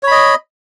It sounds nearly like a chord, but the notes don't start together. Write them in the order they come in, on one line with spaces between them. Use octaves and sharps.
C#5 B5 D#5